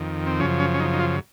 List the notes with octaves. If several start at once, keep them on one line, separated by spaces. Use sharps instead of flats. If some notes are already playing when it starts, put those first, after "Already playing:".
Already playing: F2 D#3
C4
F#2 C#3 F3 C#4
C#4
C#4
D#4
D#4
F4